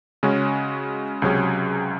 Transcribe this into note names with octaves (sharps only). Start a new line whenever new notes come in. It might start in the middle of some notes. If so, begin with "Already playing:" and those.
C#3 G#3 C#4 F#4
C#2 C3 F#3 C#4 G#4